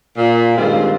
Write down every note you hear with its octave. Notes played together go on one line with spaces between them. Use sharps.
A#2
G2 D#3 G3 G#3 C4 F4